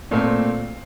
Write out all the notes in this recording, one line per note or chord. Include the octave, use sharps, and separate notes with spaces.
A#2 A3 C4